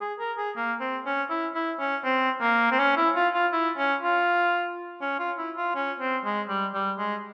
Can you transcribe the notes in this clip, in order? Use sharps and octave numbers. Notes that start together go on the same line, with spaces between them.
G#4
A#4
G#4
A#3
C4
C#4
E4
E4
C#4
C4
A#3
C4
C#4
E4
F4
F4
E4
C#4
F4
C#4
F4
E4
F4
C#4
C4
G#3
G3
G3
G#3